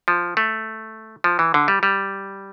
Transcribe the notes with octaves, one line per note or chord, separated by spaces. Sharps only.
F3
A3
F3
E3
D3
G3
G3